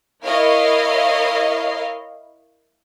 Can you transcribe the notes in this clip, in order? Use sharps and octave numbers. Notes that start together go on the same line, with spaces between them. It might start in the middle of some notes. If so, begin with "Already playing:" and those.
E4 A#4 C#5 D#5 F5